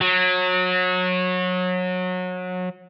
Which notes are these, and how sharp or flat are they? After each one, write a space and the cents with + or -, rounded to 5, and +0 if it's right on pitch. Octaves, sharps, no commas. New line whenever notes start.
F#3 -25